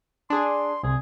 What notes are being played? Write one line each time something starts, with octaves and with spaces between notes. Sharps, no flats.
D4 G#4 C6
C2 G#4